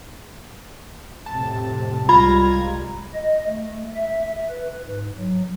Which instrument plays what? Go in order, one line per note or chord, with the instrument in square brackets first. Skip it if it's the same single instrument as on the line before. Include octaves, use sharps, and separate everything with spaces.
[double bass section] F2 A2 C3 [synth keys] A5
[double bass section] C2 G3 G#3 [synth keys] F4 A#5 G#6 [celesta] B5
[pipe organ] D#5
A3
E5
B4
G#2
F#3